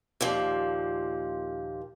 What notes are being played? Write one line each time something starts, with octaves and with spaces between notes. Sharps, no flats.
D#2 A#2 F3